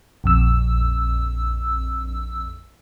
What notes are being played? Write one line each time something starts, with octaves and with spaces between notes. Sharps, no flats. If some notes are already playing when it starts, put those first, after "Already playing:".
A#1 F2 E6